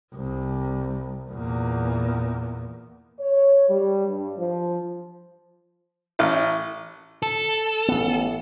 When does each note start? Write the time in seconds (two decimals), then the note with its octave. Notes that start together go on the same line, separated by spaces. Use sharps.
0.14 C2
1.30 E2 A#2
3.19 C#5
3.69 G3
4.07 G2
4.37 F3
6.19 A1
7.23 A4
7.88 A1 B3